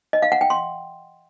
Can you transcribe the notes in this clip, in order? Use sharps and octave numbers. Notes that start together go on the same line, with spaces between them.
D#5
F5
F#5
G5
C6